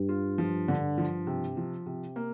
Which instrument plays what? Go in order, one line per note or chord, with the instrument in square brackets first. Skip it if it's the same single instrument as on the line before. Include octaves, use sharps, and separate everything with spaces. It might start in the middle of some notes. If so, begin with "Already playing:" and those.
Already playing: [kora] G2
[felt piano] F4
F3
D3
F3
C3
F3
C3
A#3